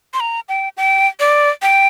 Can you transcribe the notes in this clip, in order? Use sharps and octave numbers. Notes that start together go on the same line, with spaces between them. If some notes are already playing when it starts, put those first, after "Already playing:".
C6
A#5
G5
G5
D5
G5